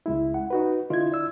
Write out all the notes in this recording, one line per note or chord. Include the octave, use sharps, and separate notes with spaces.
C#2 G#3 E4
F#5
D#4 F#4 B4
D3 E4 F4 D#5 G#6
D5 E6